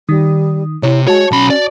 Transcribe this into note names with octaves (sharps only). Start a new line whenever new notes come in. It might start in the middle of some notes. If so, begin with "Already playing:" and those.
D#3 G3 D#6
C3 E4 C#5
G#3 F#4 C#5 A5
B1 C#4 B5
D5